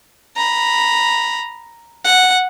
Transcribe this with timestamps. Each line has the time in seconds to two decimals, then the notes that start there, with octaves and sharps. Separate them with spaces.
0.36 A#5 B5
2.05 F#5